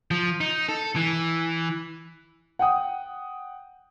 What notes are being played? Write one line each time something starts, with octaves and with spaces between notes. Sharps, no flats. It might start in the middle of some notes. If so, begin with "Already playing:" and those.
F3
D#4
A4
E3
F#5 G5 D#6